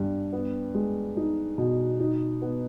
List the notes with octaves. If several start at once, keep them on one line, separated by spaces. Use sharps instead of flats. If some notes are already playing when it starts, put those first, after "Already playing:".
Already playing: G2
B3
G#3
D#4
B2
D#4
B3